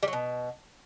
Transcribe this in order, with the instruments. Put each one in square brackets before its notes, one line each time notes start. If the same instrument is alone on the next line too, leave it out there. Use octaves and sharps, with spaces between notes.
[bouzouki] G3
F#3
B2